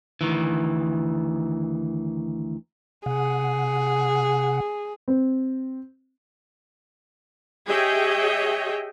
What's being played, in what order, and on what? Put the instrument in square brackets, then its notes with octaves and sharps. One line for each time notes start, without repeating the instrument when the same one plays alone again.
[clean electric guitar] D2 D#3 E3
[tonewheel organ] C3 F#5 [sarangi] G#4
[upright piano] C4
[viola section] G4 G#4 C#5 D#5 E5 G5